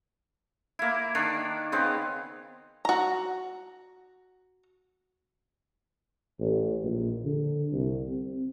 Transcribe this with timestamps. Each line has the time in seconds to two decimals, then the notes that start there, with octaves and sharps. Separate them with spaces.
0.79 A#3 E4
1.15 D#3 D4
1.72 C#3 B3 C4
2.85 F#4 A#5
6.40 A1
6.83 A#1
7.25 D3
7.72 C2
8.08 C4